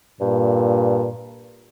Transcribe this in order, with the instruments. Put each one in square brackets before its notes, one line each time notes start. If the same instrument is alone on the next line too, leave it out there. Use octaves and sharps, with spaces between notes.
[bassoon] G2 [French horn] A#2